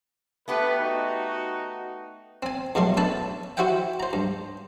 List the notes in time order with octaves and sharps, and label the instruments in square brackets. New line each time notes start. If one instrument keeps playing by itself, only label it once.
[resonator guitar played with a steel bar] A3 B3 G4 [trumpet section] B4
[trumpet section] D#4 F#4
[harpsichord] C4 G#5
E2 B2 F#3 A3 C6
C#4 D4 B4 E5 A5
E4 F#4 C5 E5 F#5 G5
C5 A#5
G2